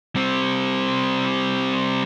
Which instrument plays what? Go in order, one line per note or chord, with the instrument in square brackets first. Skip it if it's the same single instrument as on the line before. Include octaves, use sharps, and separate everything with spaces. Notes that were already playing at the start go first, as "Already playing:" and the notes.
[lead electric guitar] G3 C4